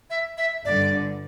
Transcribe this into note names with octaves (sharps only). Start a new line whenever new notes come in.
E5
E5
G1 G2 D3 D5